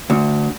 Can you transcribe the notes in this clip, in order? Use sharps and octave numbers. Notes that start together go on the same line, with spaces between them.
D2